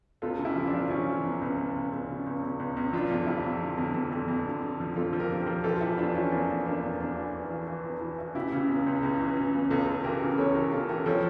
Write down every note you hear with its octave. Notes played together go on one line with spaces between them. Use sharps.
C#2 F4 A4
C#3
E4 G4
F3
D4 F4
C#2
F3 C#4 E4
F3
C#2
C#2
C#2
C#2
C#2
C#3
C#2
C#2
C#2
C#2
F3 D4 F4
F2
F2 E4 G4
F2
D3
F2
F2
F2
F2
D3
D3
F3
F2 F4 A4
F3
G4 A#4
F3
G4 A#4
F3
E3 F4 A4
F4
E2 E4 G4
E2 D4 F4
E3 C#4 E4
E2 A#3 D4
E2
E2 A#3 D4
E2
E2 A#3 D4
E3
E2
E3
E3
E2
E3
E3
C#3 E4 G4
C#3
C#2
C#2
C#2
E3
C#3
C#2
C#2 F4 A4
C#2
E3 G4 A#4
C#3
C#2 A4 C#5
E3 G4 A#4
C#3 F4 A4
E3 G4 A#4
F3 A4 C#5